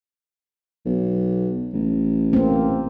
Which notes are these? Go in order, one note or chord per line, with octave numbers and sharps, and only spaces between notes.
B1
A1
A#3 C4